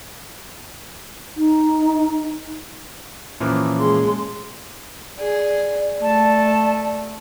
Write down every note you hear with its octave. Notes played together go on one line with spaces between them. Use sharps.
D#4
A#2 E3 F3 A#3 C#4
G#3 C6
G#4 D5
A3 A5